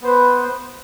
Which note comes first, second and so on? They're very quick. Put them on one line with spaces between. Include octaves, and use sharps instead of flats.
B3 C5 B4